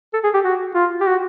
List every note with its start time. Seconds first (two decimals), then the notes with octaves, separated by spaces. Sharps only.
0.13 A4
0.24 G#4
0.34 G4
0.44 F#4
0.75 F4
1.01 G4
1.06 F#4